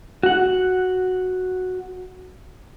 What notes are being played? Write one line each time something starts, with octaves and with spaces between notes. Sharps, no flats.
F#4 F#5